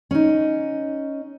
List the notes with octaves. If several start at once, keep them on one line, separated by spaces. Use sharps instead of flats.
C#4 D#4